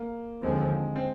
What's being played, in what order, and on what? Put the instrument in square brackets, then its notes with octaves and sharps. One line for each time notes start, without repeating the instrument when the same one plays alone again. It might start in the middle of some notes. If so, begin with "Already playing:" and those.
Already playing: [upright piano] A#3
[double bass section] D#2 D3 F3 C4 [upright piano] G#3
[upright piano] C4